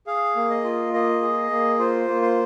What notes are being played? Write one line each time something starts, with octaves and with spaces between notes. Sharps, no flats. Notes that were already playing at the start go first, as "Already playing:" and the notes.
G#4 F5
A#3
D#5
F4
A#3 D#5
G#4
A#3
F4 C5
A#3
C5